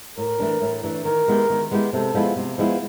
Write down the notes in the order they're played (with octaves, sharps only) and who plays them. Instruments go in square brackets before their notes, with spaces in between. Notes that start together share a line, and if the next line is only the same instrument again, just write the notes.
[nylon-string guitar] A2 [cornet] A#4
[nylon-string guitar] E3 A3 D4
A2
E3 A3 D4
[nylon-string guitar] D#3 [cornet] A#4
[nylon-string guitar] G#3 B3 E4 G4
D#3
G#3 B3 E4 G4
[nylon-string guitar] C3 [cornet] A4
[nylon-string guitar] F3 G#3 B3 E4
C3
F3 G#3 B3 E4